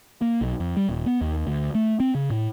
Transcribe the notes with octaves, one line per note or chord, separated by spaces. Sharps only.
A#3
B1
F2
G3
D#1
B3
D#2
D2
A3
C4
C#3
A2